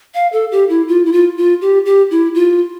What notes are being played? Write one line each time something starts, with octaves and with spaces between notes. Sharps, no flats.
F5
A4
G4
E4
F4
E4
F4
F4
G4
G4
E4
F4